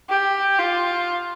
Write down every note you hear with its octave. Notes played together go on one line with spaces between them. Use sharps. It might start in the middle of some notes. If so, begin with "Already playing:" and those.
G4
F4